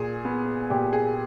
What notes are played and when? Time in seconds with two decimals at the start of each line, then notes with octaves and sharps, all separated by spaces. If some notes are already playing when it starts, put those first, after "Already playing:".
Already playing: A#2 G#4
0.25 B3
0.70 A#2 G4
0.93 G#4